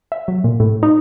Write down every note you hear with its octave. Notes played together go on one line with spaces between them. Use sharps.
E5
F#3
A#2
A2
D#4